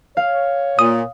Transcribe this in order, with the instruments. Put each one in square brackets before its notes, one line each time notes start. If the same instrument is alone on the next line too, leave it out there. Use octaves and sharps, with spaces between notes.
[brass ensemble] C#5 [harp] F5
[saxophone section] A#2 [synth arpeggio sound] D#6